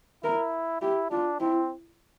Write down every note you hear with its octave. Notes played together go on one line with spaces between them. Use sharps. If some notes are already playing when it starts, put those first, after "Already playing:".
E4 A#4
E4 G4
D4 F4
C4 E4